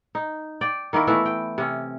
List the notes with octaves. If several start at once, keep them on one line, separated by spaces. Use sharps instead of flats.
D#4
D5 G5
D#3 A#3 E4 A#4
E3 A3 B3 E4
G5
C3 C#4